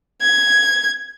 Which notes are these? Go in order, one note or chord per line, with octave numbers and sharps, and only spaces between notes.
G#6